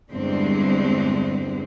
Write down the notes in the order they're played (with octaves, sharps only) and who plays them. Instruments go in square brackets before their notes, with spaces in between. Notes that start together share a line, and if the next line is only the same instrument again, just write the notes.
[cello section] E2 G2 D3 G3 G#3 C4